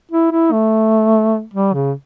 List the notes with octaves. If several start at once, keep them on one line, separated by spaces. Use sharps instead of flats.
E4
E4
A3
G3
C#3